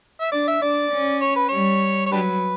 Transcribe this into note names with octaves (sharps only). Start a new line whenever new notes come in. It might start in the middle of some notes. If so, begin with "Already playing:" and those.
E5
D4 D5
E5
D4 D5
C#4
C#5
B4
G3 C#5
C#5
F#3 D4 G4 B4